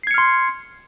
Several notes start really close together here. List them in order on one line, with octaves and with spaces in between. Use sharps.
C7 G#6 C#7 F6 C6